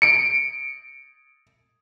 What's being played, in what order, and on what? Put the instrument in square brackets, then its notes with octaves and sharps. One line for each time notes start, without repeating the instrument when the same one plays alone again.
[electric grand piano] C#7 D7